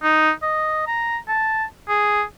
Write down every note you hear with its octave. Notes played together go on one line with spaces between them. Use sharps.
D#4
D#5
A#5
A5
G#4